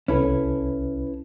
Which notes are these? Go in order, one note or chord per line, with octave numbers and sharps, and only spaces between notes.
C2 C#4 E4 A4 B4